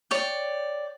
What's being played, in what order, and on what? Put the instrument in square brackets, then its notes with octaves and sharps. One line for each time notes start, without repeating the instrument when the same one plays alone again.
[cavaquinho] C#5 D5 G5